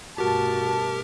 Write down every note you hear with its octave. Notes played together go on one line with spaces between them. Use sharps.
G2 B2 A3 F#4 G4 A#4 A5